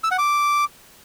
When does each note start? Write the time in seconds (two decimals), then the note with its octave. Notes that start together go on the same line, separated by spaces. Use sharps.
0.04 E6
0.11 F#5
0.18 D6